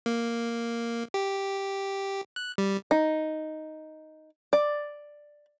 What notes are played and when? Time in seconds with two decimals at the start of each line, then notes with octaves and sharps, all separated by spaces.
0.06 A#3
1.14 G4
2.36 F#6
2.58 G3
2.91 D#4
4.53 D5